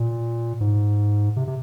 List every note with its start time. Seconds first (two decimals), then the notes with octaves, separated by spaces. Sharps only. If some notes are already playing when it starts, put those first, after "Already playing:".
Already playing: A#2
0.60 G#2
1.36 C3
1.47 C3